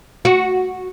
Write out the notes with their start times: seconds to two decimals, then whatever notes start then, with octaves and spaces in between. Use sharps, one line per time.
0.25 F#4